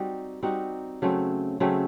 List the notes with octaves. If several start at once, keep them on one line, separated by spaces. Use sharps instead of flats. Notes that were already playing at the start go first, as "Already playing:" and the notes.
Already playing: G3 C4 D#4 F#4
G3 C4 D#4 F#4
C#3 F#3 A3 C4
C#3 F#3 A3 C4